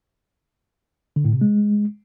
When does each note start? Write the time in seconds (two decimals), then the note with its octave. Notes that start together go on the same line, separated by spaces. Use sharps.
1.16 D3
1.25 A2
1.33 C3
1.41 G#3